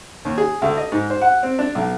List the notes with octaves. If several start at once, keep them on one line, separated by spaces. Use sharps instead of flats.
D#2
G#4
D2
D#5
G#2
C5
F#5
C4
D4
B1